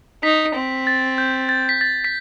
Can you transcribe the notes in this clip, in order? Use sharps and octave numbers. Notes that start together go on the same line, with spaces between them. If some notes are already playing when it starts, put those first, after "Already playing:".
D#4 B6
C4
A6
G6
A6
B6
A6
B6